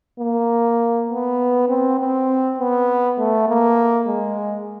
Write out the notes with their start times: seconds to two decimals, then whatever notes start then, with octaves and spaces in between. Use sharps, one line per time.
0.20 A#3
1.09 B3
1.69 C4
1.99 C4
2.59 B3
3.18 A3
3.48 A#3
4.08 G#3